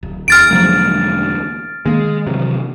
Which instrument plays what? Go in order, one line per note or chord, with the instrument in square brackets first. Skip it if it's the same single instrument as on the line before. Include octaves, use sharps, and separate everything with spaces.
[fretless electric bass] D1
[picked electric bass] E2 [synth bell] F6 A6 D7
[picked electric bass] E1 D2 A#3 [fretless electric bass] F3 F#3 G#3
[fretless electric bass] D#3 A#3 [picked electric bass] G#3
[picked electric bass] C3 E3 F#3